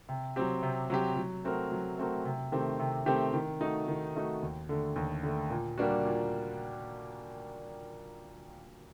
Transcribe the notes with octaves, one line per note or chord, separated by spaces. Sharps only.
C3
F#3 C4 G4
C3
F#3 C4 G4
F#3
A3 C4 F#4 A#4
F#3
A3 C4 F#4 A#4
C3
D#3 A3 C4 G4
C3
D#3 A3 C4 G4
D#3
A3 D#4 F#4
D#3
A3 D#4 F#4
D#2
D3 A3
D#2
D3 A3
A#2
G3 A#3 D4 F#4
A#2